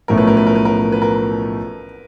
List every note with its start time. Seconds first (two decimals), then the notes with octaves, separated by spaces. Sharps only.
0.08 B1 A2 F3 A3 C#4 A#4
0.18 B4
0.28 A#4
0.37 B4
0.47 A#4
0.55 B4
0.65 A#4
0.92 B4
1.02 A#4